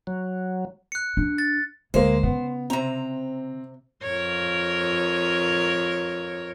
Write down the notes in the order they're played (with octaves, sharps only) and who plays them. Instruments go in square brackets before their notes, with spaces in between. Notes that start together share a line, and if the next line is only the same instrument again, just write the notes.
[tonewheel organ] F#3
[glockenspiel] F#6 C#7
[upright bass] D4
[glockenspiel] A6
[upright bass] D2 [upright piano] G#3 A#3 [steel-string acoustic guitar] C5
[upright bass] C#3 [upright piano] B3
[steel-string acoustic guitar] C3 A#5 [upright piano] C4
[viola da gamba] F2 A#4 C#5